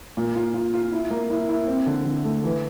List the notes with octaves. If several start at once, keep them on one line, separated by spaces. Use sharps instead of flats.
A#2
F4
F4
F4
E4
A#3
E4
E4
C4
D3
D3
A3
E3